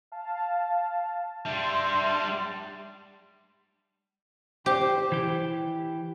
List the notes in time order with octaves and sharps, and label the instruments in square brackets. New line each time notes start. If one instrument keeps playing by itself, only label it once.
[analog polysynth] F5 A5
[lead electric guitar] G3 D4 [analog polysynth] E5 C6
[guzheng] G4 [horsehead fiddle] C5
[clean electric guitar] E3 G4